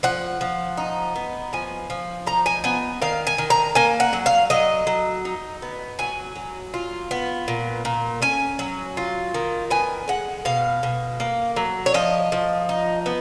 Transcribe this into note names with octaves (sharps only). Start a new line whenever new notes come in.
F3 F#5
F3
D#4
B3
F3 G#5
F3
D#4 A#5
G#5
B3 G#5
D#3 F5
G#5
D#3
A#5
A#3 G#5
F#5
F#3
F5
F#3 D#5
F#3
D#4
B3
F#3 G#5
F#3
F4
B3
A#2
A#2
C#4 G#5
F#3
F4
D#3
B3 G#5
G#3 F#5
B2 F5
B2
A#3
F#3
C#5
F3 D#5
F3
D#4
B3